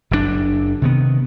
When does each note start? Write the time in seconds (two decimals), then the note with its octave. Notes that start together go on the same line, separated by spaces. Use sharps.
0.11 F#1 F#2 A2 D4
0.82 C3 D#3 B3